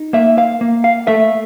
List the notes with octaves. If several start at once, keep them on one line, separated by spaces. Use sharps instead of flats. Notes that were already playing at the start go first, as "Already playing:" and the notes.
Already playing: D#4
A#3 E5
F5
A#3
F5
A3 E5